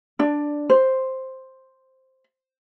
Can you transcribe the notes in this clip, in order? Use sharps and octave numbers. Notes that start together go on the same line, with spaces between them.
D4 D5
C5